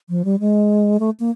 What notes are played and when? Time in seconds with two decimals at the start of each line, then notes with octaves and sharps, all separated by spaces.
0.09 F3
0.25 G3
0.40 G#3
1.00 A3
1.20 A#3